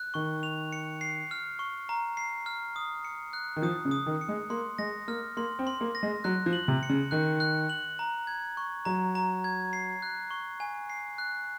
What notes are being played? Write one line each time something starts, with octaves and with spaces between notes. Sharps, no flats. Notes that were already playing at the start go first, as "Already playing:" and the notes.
Already playing: F#6
D#3 C#6
F7
C#7
C7
F6
C#6
A#5
C7
F6
D#6
C#7
F#6
D#3
F3 D#6
C#3
D#6
D#3
C#7
G#3
A#3 C6
G#3 A#6
A#3 F6
A#3 C6
C4
C6
A#3
A#6
G#3
F#3 F#6
F3
F#7
C3
C#7
C#3
D#3 F#6
F#6
F#7
A#5
G#6
C#6
F#3 A#5
A#5
G#6
C7
F#6
C#6
G#5
C7
F#6